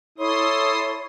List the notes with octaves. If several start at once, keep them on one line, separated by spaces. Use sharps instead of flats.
E4 A4 C#5 C6 D#6